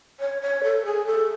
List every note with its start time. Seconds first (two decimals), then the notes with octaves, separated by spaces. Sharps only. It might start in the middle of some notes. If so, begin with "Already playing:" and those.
0.20 C#5
0.42 C#5
0.64 A4
0.85 G#4
1.06 A4